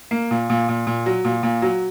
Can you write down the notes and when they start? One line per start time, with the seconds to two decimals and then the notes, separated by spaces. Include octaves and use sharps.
0.11 A#3
0.31 A#2
0.50 A#2
0.69 A#2
0.87 A#2
1.06 F#3
1.25 A#2
1.43 A#2
1.62 F#3